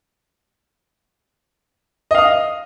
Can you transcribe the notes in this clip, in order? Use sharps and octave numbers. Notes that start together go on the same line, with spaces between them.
D#5 F5 D#6